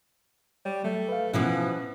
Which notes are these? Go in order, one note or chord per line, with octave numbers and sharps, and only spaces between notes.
G3 C#5
F#3 A3
B4 F5
B2 E3 F3 B3 C#4